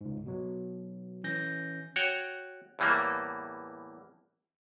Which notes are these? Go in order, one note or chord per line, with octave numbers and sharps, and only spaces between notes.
C#2 G#2
B2 F#3
E3 C#4 G6 A#6
F#4 C#5 F#5 G5
E2 A2 E3 G3 A#3